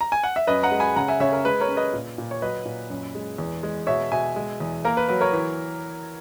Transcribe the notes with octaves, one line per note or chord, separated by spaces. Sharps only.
A#5
G#5
F#5
E5
F#2 B4 D#5
F#5 A#5
G#3
G#5 B5
C#3 F#5 A#5
E5 G#5
C#3 C#5 E5
A#4
G#3 B4
A#4 C#5
C#4
B4 D#5
A#2
A#2
C#5
F#3 B4 D#5
A#2
F#2
G#3
E2
G#3
B2 C#5 E5
B2 E5 G#5
G#3
E2
A#3 A#4
B4
F#3 B4
A#4 C#5
E3